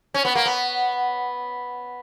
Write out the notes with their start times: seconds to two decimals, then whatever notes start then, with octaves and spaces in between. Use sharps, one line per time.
0.14 C#4
0.25 B3
0.35 A#3
0.46 B3